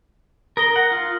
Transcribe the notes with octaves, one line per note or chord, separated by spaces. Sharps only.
A#4 D#6 A#6 G7
F#5
F4